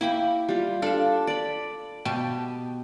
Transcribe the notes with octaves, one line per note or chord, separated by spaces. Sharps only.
A#3 E4 G4 B5 C#6
G3 F4
D4 A4 F5 A5
D5 B5
B2 G4 A5